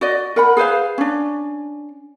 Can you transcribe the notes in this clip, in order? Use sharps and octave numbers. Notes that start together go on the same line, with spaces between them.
F#4 D5 D#5
A#4 F#5 B5
G#4 B4 C5 F5
C#4 D4